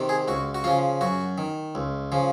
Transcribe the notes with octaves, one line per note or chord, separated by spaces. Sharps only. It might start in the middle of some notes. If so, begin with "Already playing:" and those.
Already playing: C3 D#3
G#4
C#2 F#4
F#4
C#3 F3 F4
F#2 F#4
D#3
C#2
C#3 F3